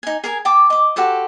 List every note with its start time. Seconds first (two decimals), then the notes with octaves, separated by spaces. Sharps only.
0.03 D#4 G#5
0.24 G#4 A#4 G#5
0.45 G5 A5 D6
0.70 D#5 D6
0.96 F#4 G4 A4 C5